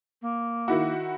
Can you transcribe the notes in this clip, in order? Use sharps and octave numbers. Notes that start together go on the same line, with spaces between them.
A#3
D#3 E4 F#4